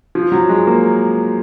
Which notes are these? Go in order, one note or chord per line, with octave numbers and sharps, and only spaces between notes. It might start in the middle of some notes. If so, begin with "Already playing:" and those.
F3
F#3
G#3
A#3